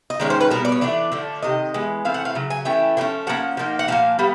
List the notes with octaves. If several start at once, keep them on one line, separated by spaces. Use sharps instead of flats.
D#5
D#3 G#3 C#4 D5
C5
B4
B2 G3 B3 A#4
D5
C#5
E3 A3 D4 D5
D3 F3 A3
C3 D#3 D#5
E3 G#3 B3
E3 A3 C4 F5
F#5
F5
C#3 F#3
G#5
E3 A3 C#4 G5
D3 F3 A3 C#4
F3 A#3 C#4 F#5
F3 A#3 D#4
F#5
A#2 F3 A#3 F5
D3 G3 B3